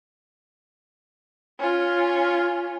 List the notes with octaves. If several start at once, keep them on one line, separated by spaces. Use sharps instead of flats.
C#4 F4